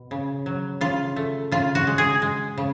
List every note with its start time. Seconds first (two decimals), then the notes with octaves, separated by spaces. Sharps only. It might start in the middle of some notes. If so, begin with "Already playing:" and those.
Already playing: B2
0.11 C#3
0.46 F#3
0.81 C#3 F4
1.16 A3
1.52 C#3 F4
1.75 F#4
1.87 G#3
1.98 G#4
2.22 G#3
2.58 C#3